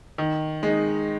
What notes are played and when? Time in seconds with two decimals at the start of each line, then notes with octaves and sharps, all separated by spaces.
0.18 D#3
0.63 G#3 D#4